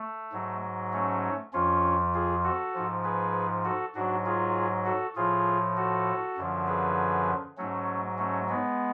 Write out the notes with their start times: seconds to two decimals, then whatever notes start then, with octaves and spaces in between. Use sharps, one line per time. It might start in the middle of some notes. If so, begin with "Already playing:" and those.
Already playing: A3
0.33 G#2 F#3
0.93 A3 C#4
1.53 F2 F3 C#4 F4
2.14 F4 G#4
2.44 F#4 A4
2.75 G#2 F3
3.04 G#4 B4
3.64 F#4 A4
3.95 G#2 F#3 D4 F#4
4.25 F4 G#4
4.85 F#4 A4
5.16 A2 F3 F4 G#4
5.77 F#4 A4
6.37 F#2 D3 F3
6.67 G#4 B4
7.57 G#2 F#3 A3 C#4
8.18 A3 C#4
8.49 G#3 B3